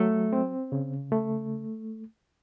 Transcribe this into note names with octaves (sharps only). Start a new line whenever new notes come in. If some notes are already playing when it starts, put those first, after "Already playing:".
Already playing: F#3 A3
C4
C#3
A3